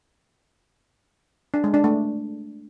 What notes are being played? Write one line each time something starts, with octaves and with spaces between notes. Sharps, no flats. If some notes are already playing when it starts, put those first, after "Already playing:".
D4
G#3
D4
A3